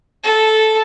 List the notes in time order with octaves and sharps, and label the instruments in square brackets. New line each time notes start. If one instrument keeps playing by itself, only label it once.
[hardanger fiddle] A4